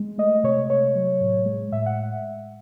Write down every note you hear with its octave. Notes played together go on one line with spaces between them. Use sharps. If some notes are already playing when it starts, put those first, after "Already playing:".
Already playing: G#3
A3 D#5
C3 C#5
C3 C#5
F#3
A2
G#3
A2 E5
F#5